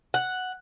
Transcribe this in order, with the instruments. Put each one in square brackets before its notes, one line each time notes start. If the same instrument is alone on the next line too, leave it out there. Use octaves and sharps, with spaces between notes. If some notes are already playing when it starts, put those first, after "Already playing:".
[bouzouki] F#5